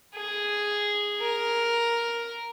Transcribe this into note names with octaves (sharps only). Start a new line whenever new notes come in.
G#4
A#4